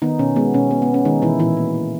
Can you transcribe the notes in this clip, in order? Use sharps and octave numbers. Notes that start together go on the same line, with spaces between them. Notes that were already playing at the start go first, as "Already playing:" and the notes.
D#3 B3 D#4
B2 C#4
G#3 B3
B2 C#4
B3
B3
B2
C#4
D#3 G#3 D#4
B2 E3 E4
A#2 E3 E4
A#3
A#3